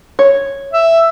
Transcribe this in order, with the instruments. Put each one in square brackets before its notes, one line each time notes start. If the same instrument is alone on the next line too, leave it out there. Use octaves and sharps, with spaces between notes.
[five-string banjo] C#5
[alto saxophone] E5